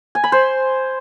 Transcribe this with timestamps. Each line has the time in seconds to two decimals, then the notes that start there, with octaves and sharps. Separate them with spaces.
0.15 G#5
0.24 B5
0.32 C5